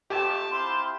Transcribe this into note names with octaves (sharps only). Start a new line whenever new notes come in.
F2 F3 A3 G4 A5
C4 E4 F4 C6 G6